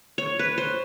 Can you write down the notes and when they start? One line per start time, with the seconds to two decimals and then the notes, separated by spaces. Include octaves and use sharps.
0.18 C#5
0.39 B4
0.58 C5